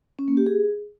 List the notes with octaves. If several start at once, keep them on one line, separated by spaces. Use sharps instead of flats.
C#4
A#3
G4
G#4